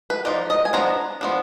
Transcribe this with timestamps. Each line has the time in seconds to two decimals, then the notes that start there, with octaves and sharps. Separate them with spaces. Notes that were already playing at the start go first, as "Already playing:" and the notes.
0.10 B4
0.25 F3 A#3 D#4 D5
0.50 D#5
0.65 G#5
0.73 F3 B3 D4 A#5
1.21 F3 B3 D4